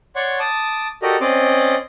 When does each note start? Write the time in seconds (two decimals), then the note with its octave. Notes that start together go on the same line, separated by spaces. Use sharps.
0.16 C#5 D5 F#5 C6 C#6
0.40 A5 D6 D#6
1.02 F#4 G4 A4 A#4 D5 D#5
1.21 C4 C#4 D5 D#5 C6 D6